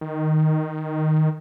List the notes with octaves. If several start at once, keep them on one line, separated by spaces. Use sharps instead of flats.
D#3